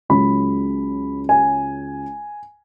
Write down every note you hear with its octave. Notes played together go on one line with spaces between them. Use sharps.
C#2 C#3 F#3 B5
G#5